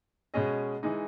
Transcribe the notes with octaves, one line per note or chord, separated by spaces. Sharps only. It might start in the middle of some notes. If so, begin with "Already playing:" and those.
B2 G#3 C#4 G#4 D#5
E3 G#3 D#4